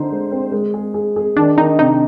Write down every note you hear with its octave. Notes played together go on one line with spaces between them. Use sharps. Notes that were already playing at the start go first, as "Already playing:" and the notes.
Already playing: D3 D#4 C5
G#3
C4
G#3
G#4
G#4
G#4
D#3 D4
D#3 D#4
C3 D#4